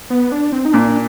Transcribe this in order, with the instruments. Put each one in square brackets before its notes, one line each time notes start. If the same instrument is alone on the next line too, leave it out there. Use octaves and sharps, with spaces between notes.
[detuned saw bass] B3
D4
C4
D#4
[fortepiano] A#2 [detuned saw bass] D4